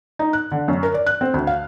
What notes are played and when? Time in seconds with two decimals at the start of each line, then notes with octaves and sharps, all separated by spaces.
0.19 D#4
0.33 F#6
0.52 D3
0.68 F#2
0.83 A#4
0.94 D5
1.06 F#6
1.21 C4
1.34 D2
1.47 F5